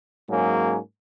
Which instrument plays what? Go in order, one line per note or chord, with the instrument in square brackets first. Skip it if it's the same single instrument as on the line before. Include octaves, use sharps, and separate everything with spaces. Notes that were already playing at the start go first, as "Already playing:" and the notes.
[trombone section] G#2 F#3 A#3 C#4 G#4